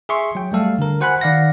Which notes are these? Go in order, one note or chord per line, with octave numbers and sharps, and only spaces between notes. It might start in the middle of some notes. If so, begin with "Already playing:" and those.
G#4 E5 C6 C#6
F#3 G5
G3 A3 A4 F5
D3 A#4
F#4 C5 F#5 G#5 B5 F#6
D#3 D5 F5 F#5 A#6